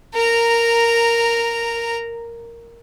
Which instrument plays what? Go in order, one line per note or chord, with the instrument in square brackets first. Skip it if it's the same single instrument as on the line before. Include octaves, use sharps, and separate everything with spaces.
[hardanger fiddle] A#4 A#5